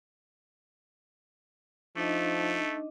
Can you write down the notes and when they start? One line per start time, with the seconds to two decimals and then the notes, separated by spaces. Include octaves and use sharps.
1.96 F3 A3 D4 D#4 D#5